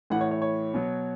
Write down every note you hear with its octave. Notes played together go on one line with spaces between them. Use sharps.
A2 E3 F#5
C#5
C#5
C#5
B2 F#3